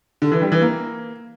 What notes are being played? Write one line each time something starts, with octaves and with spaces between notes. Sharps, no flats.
D3
E3
G3
E3
A#3